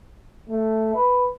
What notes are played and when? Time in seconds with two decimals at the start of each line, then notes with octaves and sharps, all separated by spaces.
0.50 A3
0.95 B4